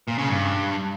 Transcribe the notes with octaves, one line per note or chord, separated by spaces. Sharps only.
A#2
C#3
G2